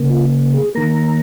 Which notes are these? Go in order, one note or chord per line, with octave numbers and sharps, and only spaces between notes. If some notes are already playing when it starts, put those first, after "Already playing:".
Already playing: C#3 A#3
F4
G#4
D#3 A#3 A#5